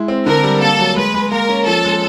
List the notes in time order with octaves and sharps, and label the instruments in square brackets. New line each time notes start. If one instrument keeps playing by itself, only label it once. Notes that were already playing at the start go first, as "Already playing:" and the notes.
Already playing: [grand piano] G#3 E4
C4
[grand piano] D3 [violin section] A#4
[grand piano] G3
[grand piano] A#3 [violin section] A4
[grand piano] F#3
[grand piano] G#3 [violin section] B4
[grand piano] G#3
[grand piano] A#3 [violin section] A#4
[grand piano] C#4
[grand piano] F3 [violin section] A4
[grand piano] G#3